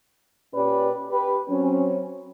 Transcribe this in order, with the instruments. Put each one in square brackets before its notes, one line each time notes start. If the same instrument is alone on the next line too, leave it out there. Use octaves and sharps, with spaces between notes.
[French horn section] A#2 C#4 G4 B4 D5
G4 B4
F#3 C4 C#4